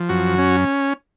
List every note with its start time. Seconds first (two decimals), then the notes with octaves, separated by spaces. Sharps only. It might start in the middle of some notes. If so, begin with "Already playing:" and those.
Already playing: F3
0.09 F#2 F#4
0.38 C#4